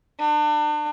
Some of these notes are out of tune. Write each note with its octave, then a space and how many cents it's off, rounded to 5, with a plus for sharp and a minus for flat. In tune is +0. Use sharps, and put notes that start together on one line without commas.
D4 +35